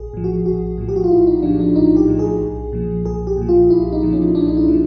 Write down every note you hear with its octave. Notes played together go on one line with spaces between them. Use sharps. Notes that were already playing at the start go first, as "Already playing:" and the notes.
Already playing: A#1 G#4
A2 F3
F#4
A#1 F#4
A2 F3
G4
F#4
F4
A#1 E4
D#4
A2 F3 D4
D4
A#1 D#4
G4
A2 F3
G#4
B1
A#2 F3
B1 G#4
G4
A#2 F3
F4
B1 E4
D#4
A#2 F3
C#4
B1 D4
D#4
E4
A#2 F3